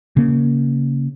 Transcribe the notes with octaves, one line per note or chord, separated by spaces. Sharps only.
C#3 A#3